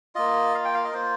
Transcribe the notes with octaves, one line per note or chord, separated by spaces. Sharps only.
A#3 F4 D#5
F5
G5
F5
D#5
A#4
A#3 F4 C5